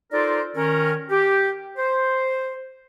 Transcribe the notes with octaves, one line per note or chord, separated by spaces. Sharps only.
D#4 F4 A4 A#4 C5 D5
D#3 C#4 A#4
G4
C5